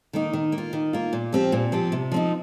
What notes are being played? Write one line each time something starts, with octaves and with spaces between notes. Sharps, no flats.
D#3 A#3 D#4
D#3
A#3
F4
D#3
A#3 F4
A#2
F3 C4 G4
A#2
F3 C4 G4
C3
F3 C4 D#4